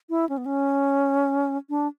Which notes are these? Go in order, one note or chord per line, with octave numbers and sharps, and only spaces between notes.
E4
C#4
B3
C#4
D4